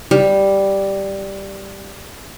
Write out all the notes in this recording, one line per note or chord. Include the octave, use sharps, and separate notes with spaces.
G3